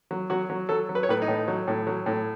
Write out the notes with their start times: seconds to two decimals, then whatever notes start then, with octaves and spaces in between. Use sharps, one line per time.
0.11 F#3
0.30 F#3 F#4
0.50 F#3
0.69 F#3 A4
0.89 F#3
0.95 B4
1.03 C#5
1.09 A2 B4
1.22 D#4
1.28 A2
1.48 F#3
1.68 A2
1.87 F#3
2.06 A2